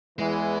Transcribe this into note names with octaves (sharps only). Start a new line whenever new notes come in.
E2 E3 G#3